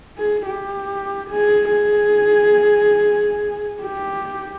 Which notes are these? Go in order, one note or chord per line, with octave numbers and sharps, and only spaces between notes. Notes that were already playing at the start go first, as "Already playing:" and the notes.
G#4
G4
G#4
G#4
G4